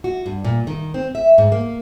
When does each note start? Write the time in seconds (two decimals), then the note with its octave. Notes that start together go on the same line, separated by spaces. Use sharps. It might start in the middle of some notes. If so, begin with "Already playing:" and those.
0.04 F#4
0.26 G2
0.44 A#2
0.67 D#3
0.94 C4
1.15 E5
1.38 G#2
1.52 A#3